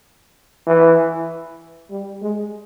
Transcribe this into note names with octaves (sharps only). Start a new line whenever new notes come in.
E3
G3
G#3